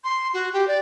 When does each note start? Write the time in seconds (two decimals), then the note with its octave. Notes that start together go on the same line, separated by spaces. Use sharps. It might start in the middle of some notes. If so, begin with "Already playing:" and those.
0.04 C6
0.33 F#4
0.53 G4
0.67 D5